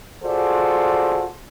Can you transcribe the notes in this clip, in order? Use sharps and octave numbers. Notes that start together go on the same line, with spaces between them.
F4 F#4 G#4 A4 C5 D5